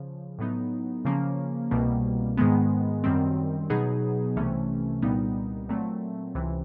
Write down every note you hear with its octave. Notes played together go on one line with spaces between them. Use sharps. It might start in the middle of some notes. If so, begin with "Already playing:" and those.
Already playing: C#3 F3
A2 F#3 B3 D#4
C#3 F3 A#3 C#4
C2 B2 G3 A#3
G#2 D#3 G#3 B3
F#2 D#3 G3 C4
B2 F#3 B3 D#4 G#4
C2 C3 E3 A3 C#4
C2 A#2 G3 B3 D#4
A#2 F#3 A3 C4
C#2 C3 E3